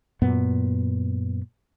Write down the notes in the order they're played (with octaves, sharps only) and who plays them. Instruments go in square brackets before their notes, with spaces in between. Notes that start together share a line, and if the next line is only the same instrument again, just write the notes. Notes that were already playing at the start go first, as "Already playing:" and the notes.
[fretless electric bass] F#2 A#2 B3